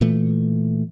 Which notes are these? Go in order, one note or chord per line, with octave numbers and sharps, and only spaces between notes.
A#2 E3 A3